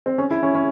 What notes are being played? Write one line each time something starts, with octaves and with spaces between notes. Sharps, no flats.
C4
C#4
E4
C#4
C#4